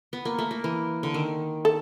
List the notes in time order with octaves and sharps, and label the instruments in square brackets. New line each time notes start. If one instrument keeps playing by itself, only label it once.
[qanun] B3
A#3
A3
A#3
E3
D3
D#3
[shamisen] A4